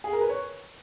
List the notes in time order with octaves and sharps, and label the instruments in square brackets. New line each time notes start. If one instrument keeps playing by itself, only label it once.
[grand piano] G#4
A#4
B4
C#5